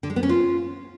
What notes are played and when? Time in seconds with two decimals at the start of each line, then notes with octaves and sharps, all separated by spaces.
0.03 D3
0.10 G#3
0.16 B3
0.23 C#4
0.29 F4